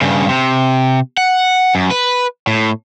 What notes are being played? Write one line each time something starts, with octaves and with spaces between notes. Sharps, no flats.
G2 C#3
C3
F#5
F#2
B4
A2